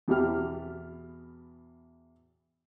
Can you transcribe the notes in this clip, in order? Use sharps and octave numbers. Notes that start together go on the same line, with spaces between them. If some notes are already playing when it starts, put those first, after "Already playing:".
E2 B2 G4 F6